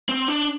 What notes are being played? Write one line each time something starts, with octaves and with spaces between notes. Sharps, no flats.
C4
D4